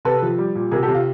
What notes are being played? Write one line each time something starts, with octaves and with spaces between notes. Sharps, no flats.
C3 A4 B4
F3
G3
A#2
C3 G#4 A#4
G4 A4
C3
F4